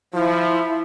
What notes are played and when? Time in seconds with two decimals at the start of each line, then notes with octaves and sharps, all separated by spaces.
0.14 F3 E4